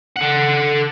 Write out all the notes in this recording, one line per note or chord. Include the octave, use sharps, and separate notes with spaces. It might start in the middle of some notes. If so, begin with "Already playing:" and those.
A4 F#5